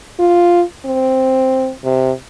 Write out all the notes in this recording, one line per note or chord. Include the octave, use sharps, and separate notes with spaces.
F4
C4
C3